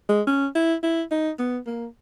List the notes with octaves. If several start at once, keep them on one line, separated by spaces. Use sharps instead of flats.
G#3
C#4
E4
E4
D#4
B3
A#3